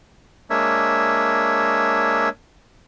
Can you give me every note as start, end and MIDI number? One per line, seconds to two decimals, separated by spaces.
0.50 2.29 56
0.50 2.29 58
0.50 2.29 62
0.50 2.29 73
0.50 2.29 76